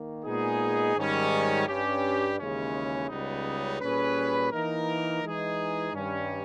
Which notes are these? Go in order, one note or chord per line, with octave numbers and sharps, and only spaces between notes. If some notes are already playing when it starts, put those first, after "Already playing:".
Already playing: D#3 A#3
A#2 G#3 B3 D#4 G#4
G#2 D#3 G3 C#4
G2 G3 C#4 G4
D#2 C#3 E3 G#3 C#4
C#2 C#3 G3 B3 D#4
A#2 G3 C#4 G#4 B4
E3 A#3 D#4 A#4
E3 G#3 D#4 G#4
G2 D#3 G3 C#4